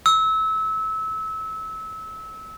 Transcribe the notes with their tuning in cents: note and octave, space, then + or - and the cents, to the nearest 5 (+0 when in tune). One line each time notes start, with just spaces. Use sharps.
E6 -25